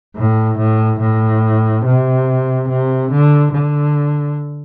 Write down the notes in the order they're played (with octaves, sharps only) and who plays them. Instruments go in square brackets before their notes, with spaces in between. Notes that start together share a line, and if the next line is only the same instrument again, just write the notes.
[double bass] A2
A2
A2
C3
C3
D3
D3